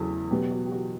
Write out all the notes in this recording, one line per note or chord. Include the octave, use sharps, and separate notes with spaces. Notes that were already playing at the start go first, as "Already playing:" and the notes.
Already playing: E2 C#3 F#3 A4
B2 F#3 B3 G4
F#4
G4
F#4